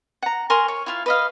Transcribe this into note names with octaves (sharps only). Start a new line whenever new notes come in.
F#5 A#5
A#4 G#5 C6 C#6
C#5
E4 F4 F5
B4 D#5 F5